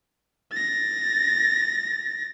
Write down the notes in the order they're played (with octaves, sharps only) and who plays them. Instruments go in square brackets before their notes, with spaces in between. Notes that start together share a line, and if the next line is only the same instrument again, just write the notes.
[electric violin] A6 A#6